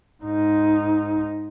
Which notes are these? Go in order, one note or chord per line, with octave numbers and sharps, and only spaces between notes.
G#2 D#4